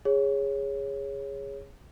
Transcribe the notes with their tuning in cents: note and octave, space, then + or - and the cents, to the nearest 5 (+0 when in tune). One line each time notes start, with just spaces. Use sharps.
G#4 -15 C#5 +0